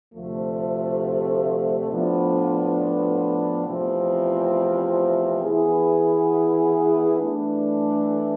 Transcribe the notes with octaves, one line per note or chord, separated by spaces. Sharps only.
D2 C3 F3 A3
A2 F3 B3 D4
E2 C3 F3 A3 C4
E3 B3 E4 G#4
E3 A3 D4